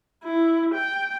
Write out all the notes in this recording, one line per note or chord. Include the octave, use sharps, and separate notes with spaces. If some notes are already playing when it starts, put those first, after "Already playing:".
E4
G5